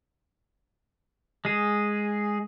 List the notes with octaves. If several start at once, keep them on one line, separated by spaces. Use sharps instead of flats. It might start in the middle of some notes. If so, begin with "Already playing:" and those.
G#3 G#4